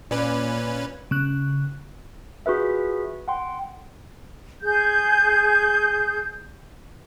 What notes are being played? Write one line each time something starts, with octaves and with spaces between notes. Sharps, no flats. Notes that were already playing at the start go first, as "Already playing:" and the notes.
A#2 C#4 B4 D5
C#3 F#6
F4 F#4 G#4 B4 E5
F#5 G5 C6
G#4 G6